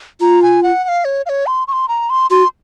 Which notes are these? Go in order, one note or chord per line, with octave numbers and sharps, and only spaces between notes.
F4 A#5
G#5
F#5
F#5
F5
C#5
F5
C#5
C6
C#6
C6
A#5
C6
F#4 C6